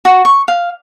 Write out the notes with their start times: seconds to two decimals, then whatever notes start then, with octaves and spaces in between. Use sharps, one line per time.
0.05 F#4
0.25 C#6
0.48 F5